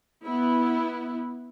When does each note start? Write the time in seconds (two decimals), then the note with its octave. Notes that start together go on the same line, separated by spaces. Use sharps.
0.23 B3 E4